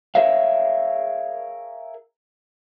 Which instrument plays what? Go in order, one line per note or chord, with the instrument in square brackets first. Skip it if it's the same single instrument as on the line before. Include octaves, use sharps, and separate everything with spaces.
[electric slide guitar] G#4 A#4 C#5 E5 F5